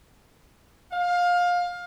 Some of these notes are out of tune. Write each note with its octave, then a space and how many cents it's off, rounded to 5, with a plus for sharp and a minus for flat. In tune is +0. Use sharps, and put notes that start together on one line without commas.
F5 +20